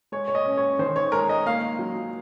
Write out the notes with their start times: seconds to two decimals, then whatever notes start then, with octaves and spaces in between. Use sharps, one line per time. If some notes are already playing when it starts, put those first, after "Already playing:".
0.12 G#3 C#5
0.28 C#5
0.35 D#5
0.46 C#4
0.57 C#5
0.79 D#3 C5
0.96 C#5
1.12 G#3 A#4
1.29 D#5
1.46 A#3 F5
1.79 F#3